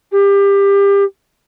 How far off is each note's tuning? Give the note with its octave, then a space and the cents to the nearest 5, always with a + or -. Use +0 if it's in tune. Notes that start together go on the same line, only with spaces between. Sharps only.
G4 +25